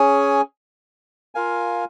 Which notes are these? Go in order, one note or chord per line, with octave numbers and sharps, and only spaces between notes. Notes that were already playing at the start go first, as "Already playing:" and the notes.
Already playing: C#4 G#4 C#5 G#5
F4 A#4 F5 G#5